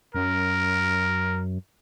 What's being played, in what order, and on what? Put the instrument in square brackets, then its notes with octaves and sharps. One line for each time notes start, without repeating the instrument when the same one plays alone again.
[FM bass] F#2 [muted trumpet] A#4